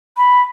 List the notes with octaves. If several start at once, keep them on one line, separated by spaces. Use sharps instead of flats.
B5